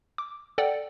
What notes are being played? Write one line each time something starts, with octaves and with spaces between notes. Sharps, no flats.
D6
A4 D5 F#5 G5